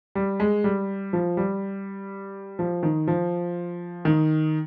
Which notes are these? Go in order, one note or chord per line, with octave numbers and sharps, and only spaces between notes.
G3
G#3
G3
F3
G3
F3
D#3
F3
D#3